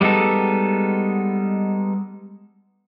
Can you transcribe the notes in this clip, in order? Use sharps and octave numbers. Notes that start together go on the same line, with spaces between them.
G3 G#3 B3 D#4 A4